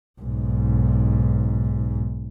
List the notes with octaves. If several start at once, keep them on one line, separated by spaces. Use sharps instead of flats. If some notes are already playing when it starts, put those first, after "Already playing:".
B1 G#2